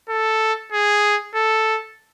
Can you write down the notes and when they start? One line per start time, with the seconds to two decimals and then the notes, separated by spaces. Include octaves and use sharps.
0.09 A4
0.72 G#4
1.34 A4